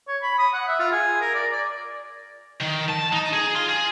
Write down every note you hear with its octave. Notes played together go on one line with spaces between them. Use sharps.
C#5
B5
D#6
F#5
E5
F4
G#4
A#4
D5
D5
D#3
A5
D#4
G#4
F4
G#4